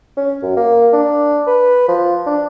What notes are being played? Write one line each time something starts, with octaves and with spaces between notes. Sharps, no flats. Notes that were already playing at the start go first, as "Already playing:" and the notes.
C#4
F#2
A#3
D4
B4
F3
D4